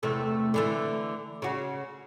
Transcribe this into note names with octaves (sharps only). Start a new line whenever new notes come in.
E2 C3 A3
D3 E3 A3
C#3 F#4